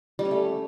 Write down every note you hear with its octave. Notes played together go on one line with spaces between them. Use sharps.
G3
C#4
A3